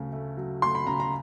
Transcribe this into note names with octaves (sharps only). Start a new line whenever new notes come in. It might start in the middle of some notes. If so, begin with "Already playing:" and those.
Already playing: D2 C#3 F#3
A3
F#3
D2 C6
B5
C#3 A#5
A#5